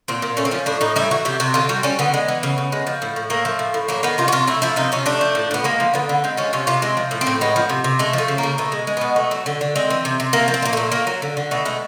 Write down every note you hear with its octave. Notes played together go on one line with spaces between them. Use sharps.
A#2 C4
A#2
A3 C#4
C4
F3 C#4
A2 D4
A2 D#4
G3 E4
E3 F#4
C3 G4
C3 F#4
D3 F4
G3 F#4
G3 C#4
D3 B3
G#3
E3
C#3
C#3
G#3
F3
A2
A2
A3 A#3
F3
A2
A2
F#3 A#3
D#3 B3
C3 F4
F#4
C3 F4
A3 E4
F3 E4
C3 D#4
C3 C#4
A3 D4
F3
A2
A2 B3
G#3 A#3
F3
D3 B3
D3
G#3 C4
F3 C#4
C3 C#4
C3 F4
G#3 C4
F3
A2
C4
A2
G#3 B3
F3
C3
C3
G#3 A3
F3 A3
C#3
A#3
C#3
B2 A3
G#3
G#3
B2 B3
A3
F#3
D3
D3
G#3 C4
E3
C3
C3
A3 A#3
F3
C4
A#2 A#3
A#2 A3
A3 A#3
F#3
D3
D3
B2 A3
G#3 A3